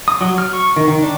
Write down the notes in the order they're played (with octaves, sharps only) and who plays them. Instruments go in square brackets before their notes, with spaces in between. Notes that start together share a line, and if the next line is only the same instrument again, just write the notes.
[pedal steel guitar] D#6
F#3
F6
C#6
D#3
D#3
D4